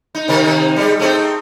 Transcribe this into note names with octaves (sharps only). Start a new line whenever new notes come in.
D#4
C3 D#3 A#4
C3 D#3
G3 G#3
A3 C4 D#4